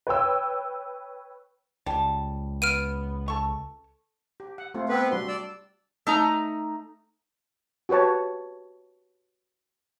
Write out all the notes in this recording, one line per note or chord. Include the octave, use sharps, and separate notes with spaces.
B4 C#5 G5 E6
C#2 G3 A5
B3 F6 D7 D#7
A4 C#6
G4
F#5
A3 C4 F4
B3 C4 A4 B4
G3 D4 F#4 C6
D5 E6
A3 D#4 A#5
F#4 G4 B4 C#5 A5